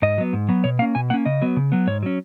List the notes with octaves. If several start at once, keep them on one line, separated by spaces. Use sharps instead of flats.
G#2 D#5
F#3 B3
G#2
F#3 B3
B2 C#5
A#3 C#4 F5
B2 G#5
A#3 C#4 F#5
C#3 D#5
F#3 B3
C#3
F#3 B3
G#2 C#5
F#3 C#4